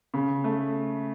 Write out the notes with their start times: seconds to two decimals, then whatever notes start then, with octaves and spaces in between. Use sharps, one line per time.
0.14 C#3
0.44 A3